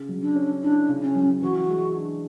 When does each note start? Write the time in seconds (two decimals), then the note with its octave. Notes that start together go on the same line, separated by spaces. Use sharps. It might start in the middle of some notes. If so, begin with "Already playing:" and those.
Already playing: C#3
0.09 F#3
0.22 D4
0.36 C#4
0.62 D4 E4
0.89 C#3
1.02 C#4
1.15 F#3
1.41 E3 F#4
1.69 G#3
1.95 D4